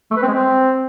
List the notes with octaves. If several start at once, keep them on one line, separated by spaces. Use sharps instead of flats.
A3
B4
C4
G#3
C4